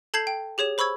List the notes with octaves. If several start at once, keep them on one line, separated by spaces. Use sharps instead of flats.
A4 A5 G6 G#6 C7 F#7
G5
G4 G#4 C#5 E7
C5 B5 C#6 E6 G#6